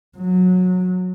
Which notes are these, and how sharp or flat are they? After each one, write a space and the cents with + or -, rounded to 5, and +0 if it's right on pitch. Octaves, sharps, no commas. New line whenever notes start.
F#3 -20